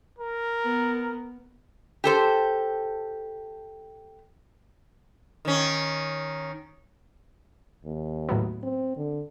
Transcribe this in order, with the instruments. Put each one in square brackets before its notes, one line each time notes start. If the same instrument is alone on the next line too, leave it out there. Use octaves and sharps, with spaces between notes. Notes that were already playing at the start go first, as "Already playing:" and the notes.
[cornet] A#4
[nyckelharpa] B3
[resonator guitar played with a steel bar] G4 A4 C5
[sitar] D#3 C#4
[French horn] D#2
[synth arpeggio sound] A2 F#3 B3
[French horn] C4
D3